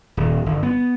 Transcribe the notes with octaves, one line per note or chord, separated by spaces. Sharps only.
D#1
G1
B3